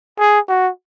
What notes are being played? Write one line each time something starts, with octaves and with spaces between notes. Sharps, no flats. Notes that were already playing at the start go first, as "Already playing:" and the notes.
G#4
F#4